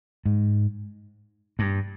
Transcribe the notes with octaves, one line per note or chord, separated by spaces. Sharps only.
G#2
G2